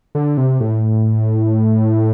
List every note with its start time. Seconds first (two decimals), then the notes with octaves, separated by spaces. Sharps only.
0.15 D3
0.37 C3
0.60 A2